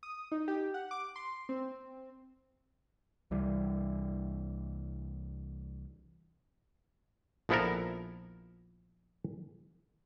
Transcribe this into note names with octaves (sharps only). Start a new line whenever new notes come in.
D#6
D#4
G4
F#5
D6
C6
C4
C2 E3 G3
A#1 F3 B3 E4 A4 A#4